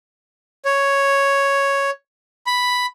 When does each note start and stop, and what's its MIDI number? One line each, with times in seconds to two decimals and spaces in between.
0.65 1.90 73
2.47 2.86 83